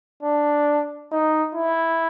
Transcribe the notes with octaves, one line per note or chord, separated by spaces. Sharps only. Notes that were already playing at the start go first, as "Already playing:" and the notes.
D4
D#4
E4